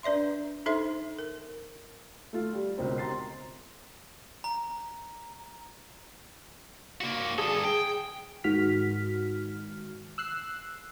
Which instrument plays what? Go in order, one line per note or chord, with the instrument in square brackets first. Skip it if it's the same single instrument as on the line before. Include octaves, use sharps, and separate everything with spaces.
[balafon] D4 B4 D5 E5 C6
D#4 A4 C5 E5 C6
A#4
[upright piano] A3 F4
G3
C#2 B2 C4 A#4 C5
A#5 C6 A6 C7
[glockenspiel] A#5
[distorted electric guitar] A#3 F#4
[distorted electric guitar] G2 A4 [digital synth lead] G#4
[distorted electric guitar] G5
[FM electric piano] G#2 D#3 F#4 F6 B6
E6 F#6 C7